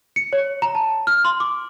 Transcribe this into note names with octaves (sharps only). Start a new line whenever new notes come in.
C#7
C#5
A#5
A5
F6
C6
D6